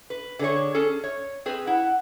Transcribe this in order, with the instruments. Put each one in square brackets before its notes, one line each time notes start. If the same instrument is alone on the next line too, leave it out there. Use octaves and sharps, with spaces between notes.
[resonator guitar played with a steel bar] B4
D3 G#4 C#5
C#4 G#4 A4
C#5
C4 G#4 B4
[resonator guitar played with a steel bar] E4 [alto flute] F#5